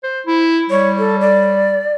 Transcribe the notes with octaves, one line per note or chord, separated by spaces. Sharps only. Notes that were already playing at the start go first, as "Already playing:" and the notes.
C5
E4
G3 C#5
A4
D5